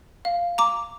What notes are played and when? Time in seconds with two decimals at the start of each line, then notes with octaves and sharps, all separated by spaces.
0.25 F5
0.58 A#5 D6